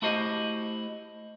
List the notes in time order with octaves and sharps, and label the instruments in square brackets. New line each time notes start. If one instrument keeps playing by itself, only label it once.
[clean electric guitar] A3 E4 F#4 G4 C5 D#5